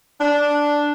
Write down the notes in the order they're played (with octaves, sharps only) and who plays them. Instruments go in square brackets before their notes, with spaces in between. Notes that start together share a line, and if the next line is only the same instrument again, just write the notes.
[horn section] D4